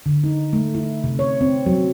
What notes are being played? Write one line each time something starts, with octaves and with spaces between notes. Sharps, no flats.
D3
D#4
A3
E4
C3
C#5
C4
F#3